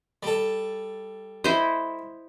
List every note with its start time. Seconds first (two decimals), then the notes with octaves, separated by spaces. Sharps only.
0.23 G3 A4
1.44 E4 C5 D#5